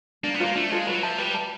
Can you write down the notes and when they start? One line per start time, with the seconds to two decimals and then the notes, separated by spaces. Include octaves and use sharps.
0.23 A#3 D4
0.34 B3
0.40 A#3 F4 A4 C5
0.55 A3 D4
0.71 G#3 F4 A4 C5
0.87 F#3 B4
1.03 F3 E5 A5
1.18 G3 B4
1.34 E5 A5